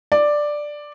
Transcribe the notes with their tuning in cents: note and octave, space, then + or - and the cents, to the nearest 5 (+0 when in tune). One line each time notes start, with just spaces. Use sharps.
D5 +5